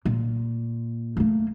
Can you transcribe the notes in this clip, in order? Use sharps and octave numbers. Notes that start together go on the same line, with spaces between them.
A#2
A3 A#3